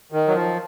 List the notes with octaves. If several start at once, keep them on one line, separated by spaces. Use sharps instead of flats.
D#3
F#3
F3